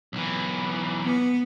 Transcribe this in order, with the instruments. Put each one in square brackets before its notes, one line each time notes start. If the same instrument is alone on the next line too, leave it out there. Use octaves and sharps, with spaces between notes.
[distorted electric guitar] B1 E3
[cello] B3